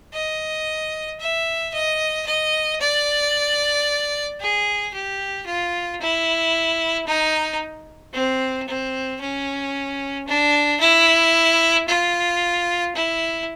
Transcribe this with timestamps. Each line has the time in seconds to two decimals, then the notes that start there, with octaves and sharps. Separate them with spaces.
0.13 D#5
1.20 E5
1.74 D#5
2.26 D#5
2.80 D5
4.41 G#4
4.94 G4
5.46 F4
6.01 E4
7.07 D#4
8.13 C4
8.68 C4
9.21 C#4
10.27 D4
10.80 E4
11.88 F4
12.95 E4